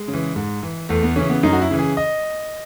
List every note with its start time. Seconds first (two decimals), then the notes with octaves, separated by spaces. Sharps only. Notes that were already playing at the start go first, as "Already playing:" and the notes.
Already playing: G#3
0.08 C#3
0.13 E3
0.36 G#2
0.63 E3
0.89 E2 A3
1.03 B3
1.16 C#3 E3 C#4
1.30 B3
1.43 F#2 D#4
1.53 F#4
1.62 E4
1.71 C#3 E3
1.79 G#4
1.97 D#5